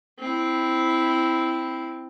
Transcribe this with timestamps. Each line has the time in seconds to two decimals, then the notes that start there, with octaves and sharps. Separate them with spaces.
0.19 C4 E4